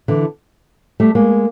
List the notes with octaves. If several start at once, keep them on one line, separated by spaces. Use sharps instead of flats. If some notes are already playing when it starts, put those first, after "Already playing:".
D3 E3
G3 A3
G#3 A#3